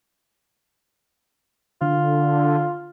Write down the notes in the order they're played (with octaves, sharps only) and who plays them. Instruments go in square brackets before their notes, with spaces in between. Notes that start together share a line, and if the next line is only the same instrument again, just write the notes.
[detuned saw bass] D3 [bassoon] F4